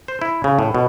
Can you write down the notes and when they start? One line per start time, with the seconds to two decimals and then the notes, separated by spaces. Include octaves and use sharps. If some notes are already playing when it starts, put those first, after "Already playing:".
0.08 C5
0.22 E4
0.44 C#3
0.59 A2
0.75 B2